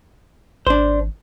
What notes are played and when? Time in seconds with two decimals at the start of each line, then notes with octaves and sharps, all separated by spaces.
0.67 G#1 D4 C5